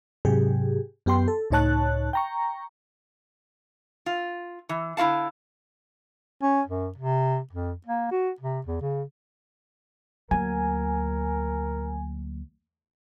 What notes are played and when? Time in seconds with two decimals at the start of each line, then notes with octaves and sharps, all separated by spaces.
0.25 G#2 C3 F#3 G4 G#4
1.06 F#2 B3 G4 G5 C6
1.28 A4
1.51 C#2 A2 D#4 C#5 A5 F#6
2.13 G5 A#5 C#6
4.06 F4
4.69 E3
4.97 D3 E4 F#4 F5 A5
6.43 C#4
6.67 F#2
6.97 C3
7.52 F2
7.86 A#3
8.11 F#4
8.40 C3
8.66 E2
8.81 C#3
10.31 D2 F#3 A#3 A#4 G#5